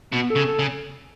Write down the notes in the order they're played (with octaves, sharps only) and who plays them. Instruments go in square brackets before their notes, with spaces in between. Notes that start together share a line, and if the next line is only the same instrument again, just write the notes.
[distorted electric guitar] B2 [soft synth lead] B3
[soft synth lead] A4
[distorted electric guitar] C#3
[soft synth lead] A4
[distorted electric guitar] C#3